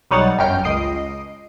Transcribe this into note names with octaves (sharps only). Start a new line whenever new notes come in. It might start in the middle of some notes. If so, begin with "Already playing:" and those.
B1 G3 D#4 C#5 F#5 A6
G1 F#2 G5 F6 G6
C#2 D#5 C7 D7 D#7